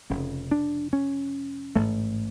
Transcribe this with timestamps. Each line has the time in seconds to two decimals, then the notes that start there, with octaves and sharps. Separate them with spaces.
0.10 F1 F2 C#3 C#4
0.51 D4
0.93 C#4
1.76 A1 G#2 A3